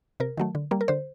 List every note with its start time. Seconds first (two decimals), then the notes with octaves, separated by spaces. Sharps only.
0.20 C3 A#4
0.37 D#3 F#3 A3
0.55 D3
0.71 G3 A#3
0.81 A#4
0.88 D3 C5